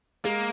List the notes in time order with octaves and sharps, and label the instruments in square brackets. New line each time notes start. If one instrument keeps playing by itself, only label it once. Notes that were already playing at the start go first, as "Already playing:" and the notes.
[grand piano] G#3 [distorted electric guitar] A#3